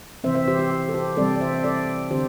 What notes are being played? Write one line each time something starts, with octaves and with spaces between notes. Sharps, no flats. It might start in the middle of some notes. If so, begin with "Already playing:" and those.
C3 E3 C4 C5 E5
C5 E5
G4 C5
G4
G4
A4
G4 C5
C3 E3 G3 C4 A4 D5
D5
C5 E5
E5
A4 D5
D3 C4 G4 C5